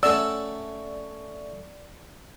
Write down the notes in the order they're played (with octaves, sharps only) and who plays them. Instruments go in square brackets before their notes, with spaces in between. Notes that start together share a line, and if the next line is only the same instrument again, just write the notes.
[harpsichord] A3 C#4 F#5 [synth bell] D5 [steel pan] E6